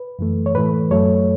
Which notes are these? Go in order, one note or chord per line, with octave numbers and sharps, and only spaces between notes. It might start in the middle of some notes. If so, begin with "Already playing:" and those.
Already playing: B4
F#2 E3 A3
C#5
A2 E3 A3 B4
F#2 F#3 A3 C#5